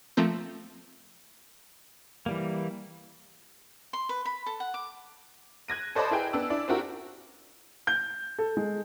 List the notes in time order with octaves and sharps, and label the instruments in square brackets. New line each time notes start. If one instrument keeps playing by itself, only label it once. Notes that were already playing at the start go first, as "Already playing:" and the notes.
[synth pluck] F3 A3 A#3 C4
[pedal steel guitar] E3 G3 A#3
[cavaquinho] C6
B4
B5
A4
F#5
D6
[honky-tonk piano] F#6 G#6 A#6 D#7
A4 C5 D5 D#5 A5 B5
E4 G#4 B4 G5
B3 D4 E6
D4 E4 D5
C4 D4 E4 F#4 G4 A#4
[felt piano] G6
A4
G#3